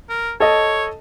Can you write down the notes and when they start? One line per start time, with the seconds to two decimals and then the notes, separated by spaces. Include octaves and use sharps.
0.10 A#4
0.40 A4 C#5 D#5